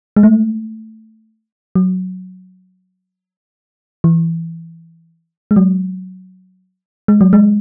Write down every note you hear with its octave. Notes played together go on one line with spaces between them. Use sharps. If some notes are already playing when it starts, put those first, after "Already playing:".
G#3
A3
F#3
E3
G#3
F#3
G#3
F#3
G#3